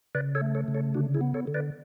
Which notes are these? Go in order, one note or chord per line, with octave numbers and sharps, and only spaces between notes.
C#3 B4 D5
A4 C#5
A3
A4 C#5
C#3
A4 C#5
D3 D4 F#4
E4 G#4
B3
A4 C#5
D3
B4 D5